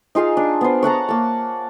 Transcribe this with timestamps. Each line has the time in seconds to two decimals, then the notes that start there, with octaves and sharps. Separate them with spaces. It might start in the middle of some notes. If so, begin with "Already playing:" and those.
0.15 D#4 F4 G#4 F5
0.37 D4
0.61 B3 C5
0.83 C#5 F#5 A5 A#5
1.09 A#3 A5